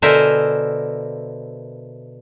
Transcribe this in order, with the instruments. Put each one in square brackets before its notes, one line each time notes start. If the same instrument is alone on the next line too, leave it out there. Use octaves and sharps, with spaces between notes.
[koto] B2 D3 A#4 C5 E5 G#5